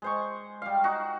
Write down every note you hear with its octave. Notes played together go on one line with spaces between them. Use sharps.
G#3 C5 C#6
G3 F5
D#4 F#4